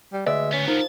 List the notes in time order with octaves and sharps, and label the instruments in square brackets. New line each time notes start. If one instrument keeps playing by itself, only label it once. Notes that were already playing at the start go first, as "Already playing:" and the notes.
[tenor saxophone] G3
[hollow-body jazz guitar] D2 B4 D5 [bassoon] G#3 [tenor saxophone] E5
[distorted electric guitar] C#2 B3 [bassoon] C#4
[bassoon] F3 [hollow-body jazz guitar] D#4 [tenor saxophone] A#4